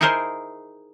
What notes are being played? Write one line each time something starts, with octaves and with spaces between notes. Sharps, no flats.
D#4 E4 G#4 A#4 C5 D#5